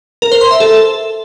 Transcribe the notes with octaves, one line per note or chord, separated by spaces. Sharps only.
A#4
C5
C6
E5
A4